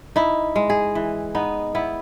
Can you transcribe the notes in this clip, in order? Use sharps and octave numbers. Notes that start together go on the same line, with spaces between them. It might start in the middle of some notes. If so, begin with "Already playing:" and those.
D#4 E4
G#3
G#4
E3
B3 D#4
B3 E4